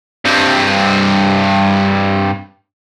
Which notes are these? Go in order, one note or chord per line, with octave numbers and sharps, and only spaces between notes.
G2 C4